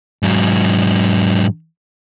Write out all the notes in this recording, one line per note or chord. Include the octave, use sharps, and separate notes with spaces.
G#2 F#3